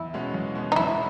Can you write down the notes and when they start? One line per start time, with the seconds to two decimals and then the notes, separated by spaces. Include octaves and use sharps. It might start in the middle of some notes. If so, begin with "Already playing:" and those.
Already playing: E2 E4
0.13 B2 G#3 C#4 F#4
0.34 E2
0.55 B2 G#3 C#4 F#4
0.72 D#4
0.76 E2 E4